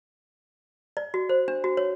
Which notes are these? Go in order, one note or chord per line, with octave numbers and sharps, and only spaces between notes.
D5
F#4
C5
D4
F#4
C#5